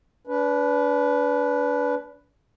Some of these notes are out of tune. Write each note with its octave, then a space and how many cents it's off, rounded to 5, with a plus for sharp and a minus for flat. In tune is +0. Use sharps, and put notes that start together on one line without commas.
D4 -35 B4 +0